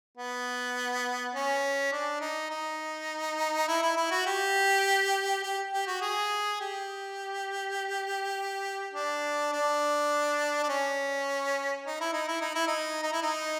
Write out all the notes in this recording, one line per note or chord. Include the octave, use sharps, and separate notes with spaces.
B3
C#4
D4
D#4
D#4
E4
E4
E4
F#4
G4
G4
G4
F#4
G#4
G4
D4
D4
D4
C#4
D#4
E4
D#4
E4
D#4
E4
D#4
D#4
E4
D#4